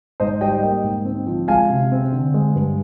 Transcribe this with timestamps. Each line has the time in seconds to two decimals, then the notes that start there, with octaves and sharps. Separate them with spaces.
0.20 G#2 C5 D#5
0.41 G3 D#5 G5
0.63 A#3 D#5 G5
0.84 G#2
1.05 C4
1.27 F3
1.48 G#3 F5 G#5
1.70 C3
1.92 C4
2.12 D3
2.34 G#3
2.55 G2